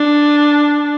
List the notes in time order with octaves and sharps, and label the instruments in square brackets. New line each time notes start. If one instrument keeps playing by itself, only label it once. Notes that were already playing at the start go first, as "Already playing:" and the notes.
Already playing: [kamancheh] D4